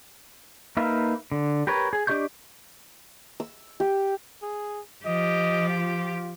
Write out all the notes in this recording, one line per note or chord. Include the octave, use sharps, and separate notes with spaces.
A#3 D#4 B4 E5 F5
D3
G4 A#4 B4 C#5
G#4
D4 G4 D#5 C#6 G6
E6
G4
G#4
F3 G4 D#5
F4